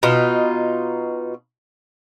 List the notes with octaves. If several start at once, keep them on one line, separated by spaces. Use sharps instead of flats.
B2 D#4 F4